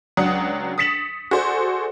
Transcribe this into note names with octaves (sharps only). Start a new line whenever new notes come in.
C#2 F#3 D4 F#5 D#6
D#6 A6 B6 C#7 E7 F#7
F#4 G#4 A4 C5 D5